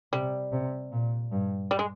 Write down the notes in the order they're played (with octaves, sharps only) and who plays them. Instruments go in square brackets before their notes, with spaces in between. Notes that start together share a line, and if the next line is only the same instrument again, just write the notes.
[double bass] C3 [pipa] G3
[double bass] C3
A#2
G2
[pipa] G3
G#3